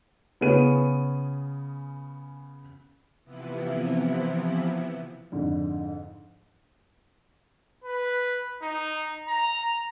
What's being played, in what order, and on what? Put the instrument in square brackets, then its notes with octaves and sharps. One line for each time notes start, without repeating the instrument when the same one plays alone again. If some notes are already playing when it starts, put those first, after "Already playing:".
[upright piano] C#3 B3 C#4 G#4 D#7
[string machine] C3 E3 F3 B3 E4
[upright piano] F2 G#2 D3
[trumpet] B4
D#4
A#5